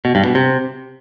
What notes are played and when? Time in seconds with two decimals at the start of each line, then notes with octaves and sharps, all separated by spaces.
0.05 B2
0.15 G2
0.25 B2
0.35 C3